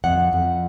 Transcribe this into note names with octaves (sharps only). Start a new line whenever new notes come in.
F2 F#5
F2